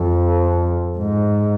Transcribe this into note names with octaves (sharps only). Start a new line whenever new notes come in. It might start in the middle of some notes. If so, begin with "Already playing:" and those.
Already playing: F2
G#2